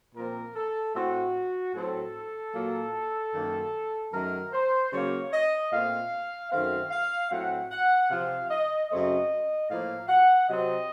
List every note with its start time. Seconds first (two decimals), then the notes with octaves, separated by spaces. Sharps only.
0.15 A#2 F3 C4 A#4
0.55 A4
0.94 A2 A3 C4 F#4
1.74 A2 F#3 C4 A4
2.54 A#2 F#3 A#3
3.32 F#2 D#3 A#3
4.13 F#2 D#3 F#3 A3 A#4
4.52 C5
4.91 C#3 F#3 A#3 C#5
5.32 D#5
5.71 A#2 A3 C4 F5
6.51 F#2 D#3 A3 C4 F5
6.91 F5
7.30 A2 F#3 A3 C4 F#5
7.71 F#5
8.10 C3 F3 C4 F5
8.50 D#5
8.89 F#2 C#3 A3 C4 D#5
9.69 A2 F3 A#3 F5
10.08 F#5
10.48 C3 F#3 C4 D#5